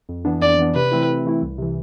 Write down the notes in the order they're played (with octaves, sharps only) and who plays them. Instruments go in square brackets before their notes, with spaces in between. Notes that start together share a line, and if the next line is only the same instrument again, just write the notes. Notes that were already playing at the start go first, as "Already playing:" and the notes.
[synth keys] F2
E3 B3 D4
[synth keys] F2 [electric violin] D5
[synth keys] E3 B3 D4
[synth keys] C3 [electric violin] B4
[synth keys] E3 A3 C4 E4
C3
E3 A3 C4 E4
C2
C3 E3